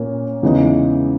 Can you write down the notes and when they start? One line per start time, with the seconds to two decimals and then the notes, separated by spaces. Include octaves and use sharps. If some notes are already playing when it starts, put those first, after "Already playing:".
Already playing: A#2 A#3 C#4
0.43 E2 C#3 E3 G#3 D#4